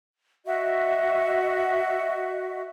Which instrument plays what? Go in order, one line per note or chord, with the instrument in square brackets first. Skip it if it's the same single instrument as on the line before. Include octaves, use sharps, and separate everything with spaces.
[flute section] F#4 D#5 E5